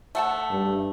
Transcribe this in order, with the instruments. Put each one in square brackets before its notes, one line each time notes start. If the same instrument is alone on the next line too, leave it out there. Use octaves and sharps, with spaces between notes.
[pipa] A3 F#5 A5
[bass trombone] G2